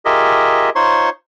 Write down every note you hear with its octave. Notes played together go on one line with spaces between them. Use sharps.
F4 G4 G#4 A#4 D#5 E5
D#4 F4 C5 C#5 C6 C#6